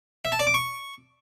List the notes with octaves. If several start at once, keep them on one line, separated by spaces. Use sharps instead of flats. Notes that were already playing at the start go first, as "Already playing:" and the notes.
E5
A5
D5
D6
C#6